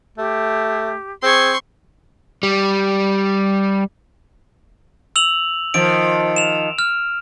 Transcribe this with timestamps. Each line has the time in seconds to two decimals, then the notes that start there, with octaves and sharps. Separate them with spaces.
0.18 A3 G4
1.23 C4 G#4 C6 C#6
2.43 G3
5.16 E6 F7 F#7
5.74 D#3 F3 D7
6.36 E7 F7
6.79 F6